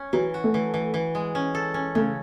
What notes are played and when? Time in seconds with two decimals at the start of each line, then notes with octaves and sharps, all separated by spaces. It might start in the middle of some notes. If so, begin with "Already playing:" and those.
Already playing: C#4
0.13 E3 F#3
0.34 F#4
0.44 A3
0.54 E3
0.74 E3
0.94 E3
1.15 G#3
1.35 C#4
1.55 A4
1.74 C#4
1.95 C#3 A3